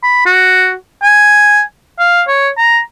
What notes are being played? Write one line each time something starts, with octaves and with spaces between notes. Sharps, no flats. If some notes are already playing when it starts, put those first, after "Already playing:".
B5
F#4
G#5
F5
C#5
A#5